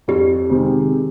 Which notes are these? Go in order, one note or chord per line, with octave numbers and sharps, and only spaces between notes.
F2 G4
C3 D#3 G#3 C4